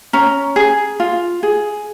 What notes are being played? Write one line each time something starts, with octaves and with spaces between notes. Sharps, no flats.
C#4 A#5
G#4
F4
G#4